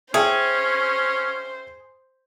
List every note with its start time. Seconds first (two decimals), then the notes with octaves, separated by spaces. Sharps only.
0.14 C#4 G#4 C5 E5 G5